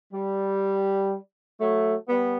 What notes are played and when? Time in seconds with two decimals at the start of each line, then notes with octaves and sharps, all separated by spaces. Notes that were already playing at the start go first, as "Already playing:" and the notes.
0.13 G3
1.60 F#3 A3
2.08 G3 B3